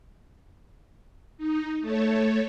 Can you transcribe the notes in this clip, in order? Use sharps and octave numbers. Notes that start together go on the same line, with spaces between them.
D#4
A3 A4 C#5